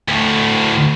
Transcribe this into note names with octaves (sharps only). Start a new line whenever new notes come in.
D2 A2